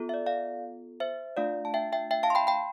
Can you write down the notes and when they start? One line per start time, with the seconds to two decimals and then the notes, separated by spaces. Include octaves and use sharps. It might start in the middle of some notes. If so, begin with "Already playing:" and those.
Already playing: B3 F4 A4
0.09 E5
0.14 D5
0.26 D5 F5
1.00 C5 E5
1.37 A3 D4 F4 D5 F5
1.65 A5
1.74 E5 G5
1.93 E5 G5
2.11 E5 G5
2.23 F5 A5
2.30 C6
2.35 G5 B5
2.47 G5 B5